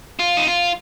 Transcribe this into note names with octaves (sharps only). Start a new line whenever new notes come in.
F4
D#4
F4